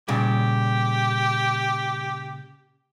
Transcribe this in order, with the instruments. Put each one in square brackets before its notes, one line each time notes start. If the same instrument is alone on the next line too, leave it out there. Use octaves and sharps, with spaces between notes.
[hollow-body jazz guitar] A#2 C#3 G3 [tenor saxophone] G4